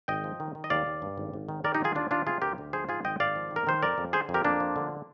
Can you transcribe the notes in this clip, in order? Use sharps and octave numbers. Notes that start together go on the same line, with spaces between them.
G#1 D#5 G5
F3
D#3
D#3
D#5
D#2 D5 F5
D#2
G2
G#1
G#1
D#3
D#3 A#4 D5
D#4 G4
D#3 F4 G#4
D#2 D4 F4
D#2 D4 F4
C3 F4 G#4
D2 G4 A#4
D2
F3 G#4 C5
G#2 F4 G#4
G#1 D#5 G5
G#1 D5 F5
F3
D#3
A#4
D#3 C5
F2 A#4 D5
F2
D3 G#4 C5
F2
G4 A#4
F2 A#3 D4
F3
D3